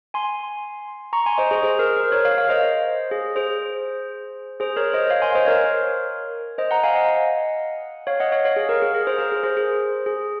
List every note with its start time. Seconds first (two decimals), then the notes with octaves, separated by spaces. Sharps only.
0.14 G#5 C6
1.13 A#5 C#6
1.26 G#5 C6
1.38 C5 D#5
1.51 G#4 C5
1.63 G#4 C5
1.79 A#4
1.97 A#4
2.12 A#4 C#5
2.25 C#5 F5
2.37 C#5 F5
2.49 C5 D#5
3.11 G#4
3.36 G#4 C5
4.60 G#4 C5
4.76 A#4 C#5
4.93 C5 D#5
5.10 C#5 F5
5.22 G#5 C6
5.35 C5 D#5
5.47 A#4 C#5
6.58 C5 D#5
6.71 F#5 A#5
6.83 F5 G#5
6.95 D#5 F#5
8.07 C#5 F5
8.20 D#5 F#5
8.32 C#5 F5
8.45 C#5 F5
8.56 G#4
8.69 A#4
8.82 G#4
8.94 G#4
9.07 G#4 C5
9.18 A#4
9.32 G#4
9.43 G#4 C5
9.57 G#4
10.06 G#4